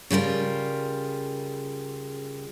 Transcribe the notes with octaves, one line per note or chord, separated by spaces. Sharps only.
C#3 G3 F4 A#4